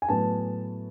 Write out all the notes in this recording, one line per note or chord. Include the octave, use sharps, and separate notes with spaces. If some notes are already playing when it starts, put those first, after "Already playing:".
G#5
A2 F#3 B3 A5